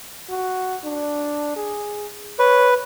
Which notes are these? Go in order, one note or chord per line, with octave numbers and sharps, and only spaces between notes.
F#4
D4
G#4
B4 C#5